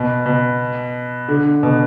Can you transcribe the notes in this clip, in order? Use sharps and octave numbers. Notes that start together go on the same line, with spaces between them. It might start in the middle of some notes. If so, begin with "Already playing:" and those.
Already playing: B2
B2
D3
B2